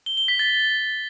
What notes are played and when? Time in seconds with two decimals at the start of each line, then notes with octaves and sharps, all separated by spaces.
0.06 G7
0.17 G7
0.28 B6
0.39 A6